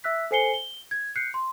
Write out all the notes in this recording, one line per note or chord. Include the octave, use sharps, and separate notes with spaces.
E5 E6 F#6 B6
A4 C5 G#5 C7 C#7 G7
G7
G#6
F#6 G6 C7 C#7
C6